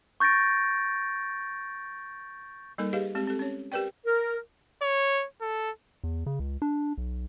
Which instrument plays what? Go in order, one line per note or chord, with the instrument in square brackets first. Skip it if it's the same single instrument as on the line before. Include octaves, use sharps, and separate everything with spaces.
[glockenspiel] C#6 G6 A6 A#6 D7
[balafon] G3 A#3 D#4 A4 A#4
G4 G#4 B4 D#5 F5
G#3 C4 G4
C4 G4 A4
C#4 C#5
G4 A#4 B4 D5 G5
[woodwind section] A#4
[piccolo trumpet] C#5
A4
[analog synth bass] E2
C#3
C#2
D4
B1